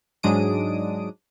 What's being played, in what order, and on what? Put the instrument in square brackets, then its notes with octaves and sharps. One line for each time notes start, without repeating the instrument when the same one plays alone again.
[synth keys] G#2 F#3 G#3 D4 D#6 D7